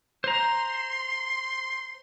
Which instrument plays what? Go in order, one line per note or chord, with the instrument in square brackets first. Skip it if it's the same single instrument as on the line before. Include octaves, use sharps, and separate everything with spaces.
[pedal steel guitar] C5 A#5 [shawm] C6